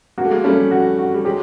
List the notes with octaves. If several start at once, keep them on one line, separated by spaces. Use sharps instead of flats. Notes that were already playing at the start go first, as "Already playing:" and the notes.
A#3 F#4
A3
G#3 A#3
G3 A3 C#4
F#4
F#4
G3
F#3 G#3 G4